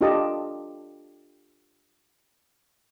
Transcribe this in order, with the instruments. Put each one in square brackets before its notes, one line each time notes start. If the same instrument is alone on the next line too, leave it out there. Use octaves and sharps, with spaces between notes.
[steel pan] D4 F4 G4 A4 D#5 A5